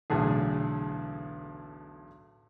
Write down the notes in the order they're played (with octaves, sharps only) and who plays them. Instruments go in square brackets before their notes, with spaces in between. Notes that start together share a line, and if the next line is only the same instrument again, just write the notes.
[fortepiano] B1 E2 A2 D3 G#4